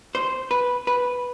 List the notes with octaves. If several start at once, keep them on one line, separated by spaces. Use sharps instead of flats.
C5
B4
B4